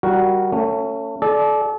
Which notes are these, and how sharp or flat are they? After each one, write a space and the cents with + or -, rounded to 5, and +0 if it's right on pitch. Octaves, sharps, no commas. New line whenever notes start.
G3 -10 F#4 +0 A#4 +0
A3 +30 C#4 +0
A4 -35 D5 +0